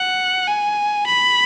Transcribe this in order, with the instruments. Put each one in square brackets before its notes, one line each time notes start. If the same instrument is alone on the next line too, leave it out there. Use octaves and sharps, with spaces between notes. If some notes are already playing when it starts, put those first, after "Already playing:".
Already playing: [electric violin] F#5
G#5
B5